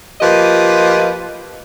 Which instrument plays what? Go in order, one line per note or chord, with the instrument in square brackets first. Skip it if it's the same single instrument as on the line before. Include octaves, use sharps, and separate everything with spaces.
[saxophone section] F3 A#3 G4 B4 D#5